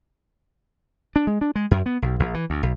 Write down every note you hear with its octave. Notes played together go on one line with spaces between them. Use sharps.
D4
G#3
D4
G#3
F#2
B3
B1
A#1
E3
D2
B1